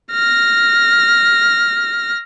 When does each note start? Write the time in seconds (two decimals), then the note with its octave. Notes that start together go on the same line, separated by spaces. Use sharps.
0.11 F6 A#6